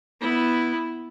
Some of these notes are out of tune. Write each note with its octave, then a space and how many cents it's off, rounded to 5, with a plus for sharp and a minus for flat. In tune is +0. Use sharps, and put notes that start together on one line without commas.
B3 +0 E4 -5